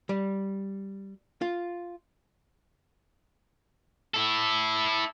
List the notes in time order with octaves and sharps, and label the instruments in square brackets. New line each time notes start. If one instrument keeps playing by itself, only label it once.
[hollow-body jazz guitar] G3
F4
[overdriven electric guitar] E4 A4